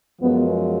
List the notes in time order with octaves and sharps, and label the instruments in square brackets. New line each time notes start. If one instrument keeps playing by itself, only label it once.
[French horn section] F#2 F3 G#3 B3